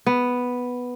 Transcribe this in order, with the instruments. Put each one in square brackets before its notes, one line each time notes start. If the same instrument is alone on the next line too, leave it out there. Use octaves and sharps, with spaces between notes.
[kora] B3